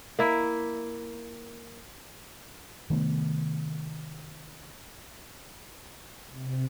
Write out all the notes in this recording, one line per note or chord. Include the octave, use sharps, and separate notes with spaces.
A#3 E4
C3 D#3 A3 B3
C3